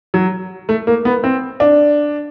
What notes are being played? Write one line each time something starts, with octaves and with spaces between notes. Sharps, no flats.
F#3
A3
A#3
B3
C4
D4